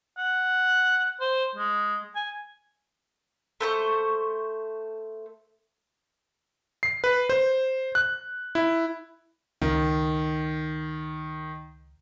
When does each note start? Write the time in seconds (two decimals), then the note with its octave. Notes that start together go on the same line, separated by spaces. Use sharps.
0.18 F#5
1.21 C5
1.56 G#3
2.15 G#5
3.61 A3 C5 C#6
6.83 C7
7.04 B4
7.29 C5
7.95 F#6
8.55 E4
9.62 C#2 D#3